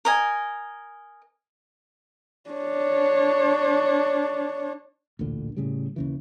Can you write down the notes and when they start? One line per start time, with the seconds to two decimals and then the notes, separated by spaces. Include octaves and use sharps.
0.05 A#4 D#5 G#5
2.50 D4 C#5
5.19 A1 D2 A#2 D3
5.57 A2 C#3 G3
5.96 D#2 C#3 E3